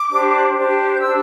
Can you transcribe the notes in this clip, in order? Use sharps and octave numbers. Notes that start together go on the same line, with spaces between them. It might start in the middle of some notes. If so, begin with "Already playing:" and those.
Already playing: D6
D4 G4 C5
D4 G4 C5
G6
D4 G4 C5 E6